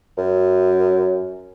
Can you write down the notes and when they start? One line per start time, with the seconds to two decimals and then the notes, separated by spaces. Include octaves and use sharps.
0.18 F#2